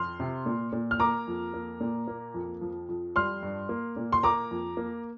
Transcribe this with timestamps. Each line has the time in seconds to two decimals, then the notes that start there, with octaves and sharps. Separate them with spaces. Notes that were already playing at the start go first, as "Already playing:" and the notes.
Already playing: F2 C6 F6
0.20 C3
0.46 A#2
0.72 A#2
0.91 F6
1.00 A#3 A#5 D6
1.28 F2
1.54 A#3
1.80 A#2
2.08 A#3
2.34 F2
2.61 F3
2.89 F2
3.16 G3 C6 F6
3.43 G2
3.69 A#3
3.96 A#2
4.12 C6
4.23 A#3 A#5 D6
4.51 F2
4.77 A#3